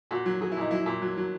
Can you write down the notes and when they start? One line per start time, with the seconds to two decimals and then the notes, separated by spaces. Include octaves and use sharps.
0.11 A#2 F#4
0.26 F#3
0.41 F#3 G#4
0.52 E4
0.57 A#2 D#4
0.71 F#3 E4
0.86 A#2
1.02 F#3
1.17 F#3